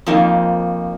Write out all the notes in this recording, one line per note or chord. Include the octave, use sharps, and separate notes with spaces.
F2 F3 A#3 D#4